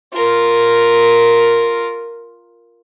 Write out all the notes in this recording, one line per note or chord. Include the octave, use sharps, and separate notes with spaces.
F4 A#4